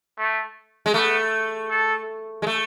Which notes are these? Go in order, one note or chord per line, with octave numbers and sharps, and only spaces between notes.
A3
G#3
A3 B3
A4
G#3
A3